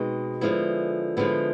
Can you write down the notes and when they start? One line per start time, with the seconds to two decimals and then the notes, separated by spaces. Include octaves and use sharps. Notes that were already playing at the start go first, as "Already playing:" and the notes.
Already playing: B2 G#3 C4 D#4
0.41 D3 F3 G#3 B3 E4
1.17 D3 F3 G#3 B3 E4